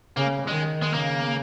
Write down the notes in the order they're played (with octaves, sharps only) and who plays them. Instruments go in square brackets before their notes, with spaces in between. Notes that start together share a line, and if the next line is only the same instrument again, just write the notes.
[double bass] C#3 [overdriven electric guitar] A#3
[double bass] D#3 [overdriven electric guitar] G#3
[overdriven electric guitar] G#3
[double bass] C#3 [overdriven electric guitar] A#3